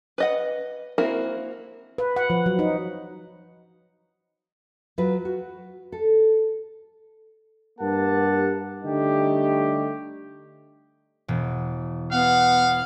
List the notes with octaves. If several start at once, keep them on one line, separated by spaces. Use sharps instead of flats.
B4 D#5 F#5
A#3 C4 E4 F#4 A#4
B4
F#5
F3
F#3
D#4
F#3 F4 B4
F#4
A4
G2 A#3 G4 A#4 F#5 A5
D3 G3 A3 D#4 G4
E1
B3 F5 F#5